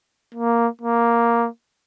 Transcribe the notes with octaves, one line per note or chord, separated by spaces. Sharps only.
A#3
A#3